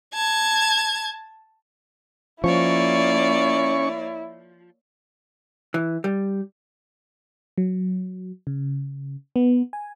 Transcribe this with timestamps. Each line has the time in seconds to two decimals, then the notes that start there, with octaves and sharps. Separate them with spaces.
0.14 A5 G#6
2.44 F3 A#3 C#4 E4 C#5 D5 C#6
5.74 E3
6.04 G3
7.58 F#3
8.47 C#3
9.36 B3
9.73 G#5